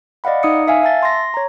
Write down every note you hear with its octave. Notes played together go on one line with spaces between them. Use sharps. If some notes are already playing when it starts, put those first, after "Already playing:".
D5 D#5 F5 F#5 B5
D#4 D#6 C#7
E5 F5 G#5
E5 A5 A6
C6 A#6
C#5 A#5